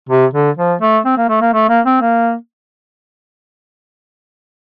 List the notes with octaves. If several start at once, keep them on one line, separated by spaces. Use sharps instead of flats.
C3
D3
F3
A3
C4
A#3
A3
A#3
A3
A#3
C4
A#3